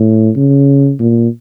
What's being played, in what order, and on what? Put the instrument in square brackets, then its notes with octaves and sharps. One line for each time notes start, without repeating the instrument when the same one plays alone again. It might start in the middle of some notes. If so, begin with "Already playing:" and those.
Already playing: [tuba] A2
C#3
A#2